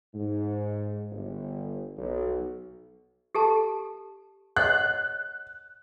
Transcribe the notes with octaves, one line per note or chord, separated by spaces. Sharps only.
G#2
G1
B1
G4 A4 A5
C#5 D#5 F#5 F#6